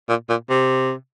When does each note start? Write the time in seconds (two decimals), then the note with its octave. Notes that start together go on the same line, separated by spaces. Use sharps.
0.09 A#2
0.29 A#2
0.49 C3